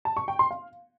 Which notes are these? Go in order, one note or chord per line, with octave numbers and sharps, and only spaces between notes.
A5
C#6
G5
C6
F5